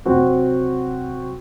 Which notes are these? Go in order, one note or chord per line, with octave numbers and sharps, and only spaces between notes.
C3 F#3 C4 F#4